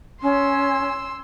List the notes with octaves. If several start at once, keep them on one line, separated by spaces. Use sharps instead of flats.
C#4 C6 E6